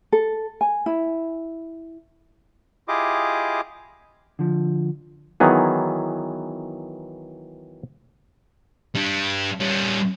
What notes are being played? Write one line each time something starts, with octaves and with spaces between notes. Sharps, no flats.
A4
G#5
E4
E4 F4 G4 G#4 D#5 D6
D3 F3
D#3 E3 F#3 B3 G#4
G3 D4
G3 C#4